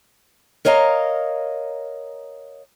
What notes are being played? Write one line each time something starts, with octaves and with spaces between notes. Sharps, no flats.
A#4 C#5 D#5 F5 A5 A#5